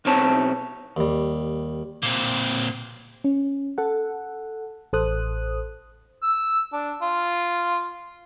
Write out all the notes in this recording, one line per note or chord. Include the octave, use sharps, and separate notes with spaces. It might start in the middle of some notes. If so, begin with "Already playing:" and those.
B1 B2 C4 C#5 A5
D#2 G3
A#2 C4
C#4
A4 F#5
A1 A4 C5 D#6 F#6
E6
D4
F4